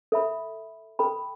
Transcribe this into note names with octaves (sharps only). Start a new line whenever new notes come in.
A4 E5 B5
A4 G5 B5